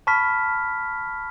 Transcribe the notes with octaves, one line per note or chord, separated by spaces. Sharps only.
A5 B5 C#6 F6 B6